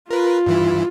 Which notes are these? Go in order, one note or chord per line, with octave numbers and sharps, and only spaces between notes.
F4 A#4 B4
G2 E3 E4